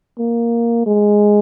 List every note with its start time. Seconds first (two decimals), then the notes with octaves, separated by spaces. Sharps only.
0.19 A#3
0.86 G#3